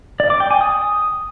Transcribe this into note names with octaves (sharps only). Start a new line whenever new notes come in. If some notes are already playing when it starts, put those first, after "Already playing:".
D5
D6
G5
G#5
D#6